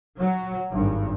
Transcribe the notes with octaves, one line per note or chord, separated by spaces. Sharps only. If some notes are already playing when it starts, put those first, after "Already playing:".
F#3
G#1 G2